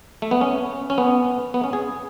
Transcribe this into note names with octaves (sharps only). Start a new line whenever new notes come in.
A3
B3
C#4
C#4
B3
B3
C#4
G#4